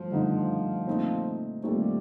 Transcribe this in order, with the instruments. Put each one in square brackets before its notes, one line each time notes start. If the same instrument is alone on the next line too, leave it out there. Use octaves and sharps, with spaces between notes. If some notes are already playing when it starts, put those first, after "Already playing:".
Already playing: [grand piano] G2 A3 [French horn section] F3
[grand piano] G2 D3 A3 D#4
A#2 A3 C4 D#4
[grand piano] A#2 A3 C4 D#4 [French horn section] G3